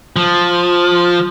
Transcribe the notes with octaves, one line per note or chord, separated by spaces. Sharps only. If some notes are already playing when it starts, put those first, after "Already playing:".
F3